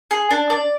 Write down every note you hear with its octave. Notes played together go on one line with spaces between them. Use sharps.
G#4
D4
D5